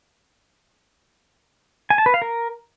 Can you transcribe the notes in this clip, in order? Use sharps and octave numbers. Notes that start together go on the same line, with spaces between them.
G#5
A5
B4
F5
A#4